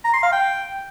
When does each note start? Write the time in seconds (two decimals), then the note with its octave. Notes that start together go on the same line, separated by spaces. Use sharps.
0.04 A#5
0.14 C6
0.23 F5
0.32 G5